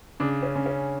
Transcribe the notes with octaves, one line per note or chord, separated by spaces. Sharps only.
C#3 D4
C#4
C#3
C#4